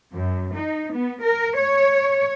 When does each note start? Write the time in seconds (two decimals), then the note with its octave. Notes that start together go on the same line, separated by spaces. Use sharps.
0.14 F#2
0.57 D#4
0.93 B3
1.22 A#4
1.56 C#5